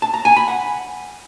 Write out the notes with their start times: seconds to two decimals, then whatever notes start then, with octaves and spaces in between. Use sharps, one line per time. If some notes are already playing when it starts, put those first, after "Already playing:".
0.02 A5
0.14 A#5
0.25 G#5
0.36 B5
0.48 F#5